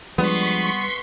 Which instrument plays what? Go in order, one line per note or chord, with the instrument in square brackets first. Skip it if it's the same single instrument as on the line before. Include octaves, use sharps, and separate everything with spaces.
[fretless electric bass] F3 G#3 D4 [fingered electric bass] G3 [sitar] B3 [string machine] C6 C#6 B6